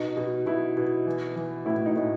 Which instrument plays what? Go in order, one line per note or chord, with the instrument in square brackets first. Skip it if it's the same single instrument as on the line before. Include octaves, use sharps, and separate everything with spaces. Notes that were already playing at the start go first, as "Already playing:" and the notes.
Already playing: [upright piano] B2 D#4
B2
B2 E4
B2
E3
E3
A2 E4
D#4
A2